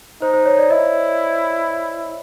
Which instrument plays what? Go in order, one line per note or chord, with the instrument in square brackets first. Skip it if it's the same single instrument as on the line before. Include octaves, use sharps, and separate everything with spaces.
[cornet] D#4 [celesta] C5
[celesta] C5
C#5
D5
[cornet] E4 [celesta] D#5